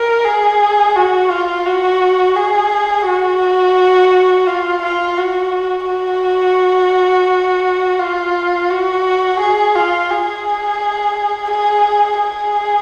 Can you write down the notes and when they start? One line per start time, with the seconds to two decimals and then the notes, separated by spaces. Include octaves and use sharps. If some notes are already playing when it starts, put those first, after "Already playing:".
Already playing: A#4
0.25 G#4
0.96 F#4
1.31 F4
1.66 F#4
2.36 G#4
3.07 F#4
4.47 F4
4.82 F4
5.18 F#4
5.88 F#4
7.99 F4
8.70 F#4
9.41 G#4
9.75 F4
10.10 G#4
11.51 G#4
12.22 G#4